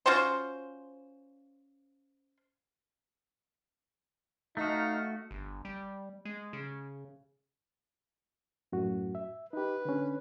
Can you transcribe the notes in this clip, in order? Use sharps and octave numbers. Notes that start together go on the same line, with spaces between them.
C#4 F4 F#4 C5
A3 D#4 F#4 F5
G1
G3
G#3
C#3
F#2 A2 F#4
E5
D#4 G4 B4
D3 C#4